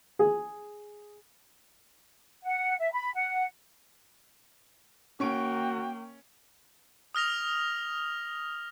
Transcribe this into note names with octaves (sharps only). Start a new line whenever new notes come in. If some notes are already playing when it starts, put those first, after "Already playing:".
G#4
F#5
E5
B5
F#5
A#3 C#4 F#4 G5 C#6 D7
D#6 F6 A#6 F7